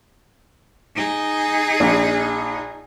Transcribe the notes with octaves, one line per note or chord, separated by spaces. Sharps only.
D#4 G#4
A#1